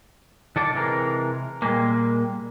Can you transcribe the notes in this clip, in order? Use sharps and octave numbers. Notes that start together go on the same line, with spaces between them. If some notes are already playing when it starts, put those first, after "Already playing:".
D#3 A4 D5
C3 E3 G#3 A#4
A#2 G3 G#3 A#3